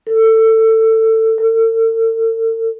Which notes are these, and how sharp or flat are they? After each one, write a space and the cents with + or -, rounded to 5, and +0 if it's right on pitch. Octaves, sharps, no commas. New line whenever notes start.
A4 +20
A4 +45